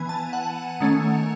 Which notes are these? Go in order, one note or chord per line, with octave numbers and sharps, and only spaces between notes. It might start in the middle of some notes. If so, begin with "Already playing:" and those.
Already playing: E3 B3 G#5
A5
F#5
D#3 A3 C#4